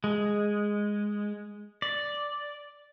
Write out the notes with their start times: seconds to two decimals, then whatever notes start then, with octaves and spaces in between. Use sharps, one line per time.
0.04 G#3
1.82 D5